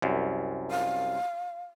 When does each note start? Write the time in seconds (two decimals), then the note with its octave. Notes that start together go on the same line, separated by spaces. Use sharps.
0.02 C2 F#2
0.71 F5